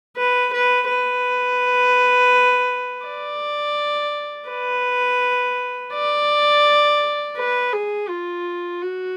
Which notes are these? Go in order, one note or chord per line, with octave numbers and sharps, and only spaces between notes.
B4
B4
B4
D5
B4
D5
B4
G#4
F4
F#4